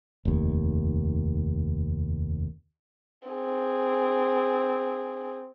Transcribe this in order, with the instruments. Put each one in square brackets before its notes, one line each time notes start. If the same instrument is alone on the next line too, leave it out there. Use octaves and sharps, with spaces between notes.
[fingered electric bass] F1 D#2
[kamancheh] C4 G#4